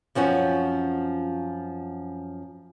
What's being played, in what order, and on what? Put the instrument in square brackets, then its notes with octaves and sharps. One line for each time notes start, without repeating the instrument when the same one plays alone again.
[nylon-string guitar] F#2 F3 C4 C#4 F#4